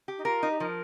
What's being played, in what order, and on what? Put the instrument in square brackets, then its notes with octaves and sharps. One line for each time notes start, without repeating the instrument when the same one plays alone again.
[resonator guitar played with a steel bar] G4
[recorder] D#4
[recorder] F4 [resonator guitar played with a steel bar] A#4
[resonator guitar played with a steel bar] D#4
[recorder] G4
[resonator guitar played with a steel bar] F3 [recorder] A#4